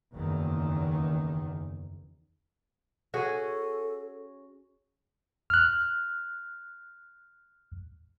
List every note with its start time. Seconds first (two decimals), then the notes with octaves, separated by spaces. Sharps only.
0.13 F#1 E2 D#3
3.14 C#4 F#4 G#4 A4
5.50 F6 F#6